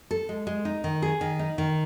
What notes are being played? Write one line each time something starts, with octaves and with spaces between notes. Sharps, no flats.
A4
G#3
G#3
D#4
D#3
G#4
D#3
D#4
D#3